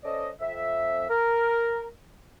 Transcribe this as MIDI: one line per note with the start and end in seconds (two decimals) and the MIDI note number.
0.04 0.29 61
0.04 0.29 69
0.04 0.29 72
0.04 0.29 74
0.04 0.29 75
0.41 1.05 41
0.41 1.05 76
1.09 1.88 70